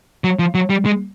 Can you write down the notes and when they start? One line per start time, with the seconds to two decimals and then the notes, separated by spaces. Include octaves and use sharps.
0.24 F#3
0.39 F3
0.55 F#3
0.70 G3
0.86 G#3